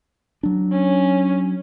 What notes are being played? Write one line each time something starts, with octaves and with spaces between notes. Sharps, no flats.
F#3 D4
C#4